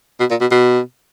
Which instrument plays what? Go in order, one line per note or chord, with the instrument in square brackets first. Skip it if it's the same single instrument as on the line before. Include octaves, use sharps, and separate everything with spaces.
[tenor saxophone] B2
A#2
B2
B2